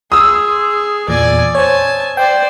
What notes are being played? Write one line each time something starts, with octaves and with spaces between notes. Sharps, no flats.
G#4 C6 D#6 E6
E2 A#2 D5 G#5
C5 C#5 G#5 A5
C5 D5 G5